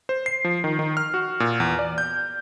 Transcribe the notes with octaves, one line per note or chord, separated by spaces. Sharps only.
C5
C7
F3
D#3
D#3
F6
F#4
A#2
E2
D5
G6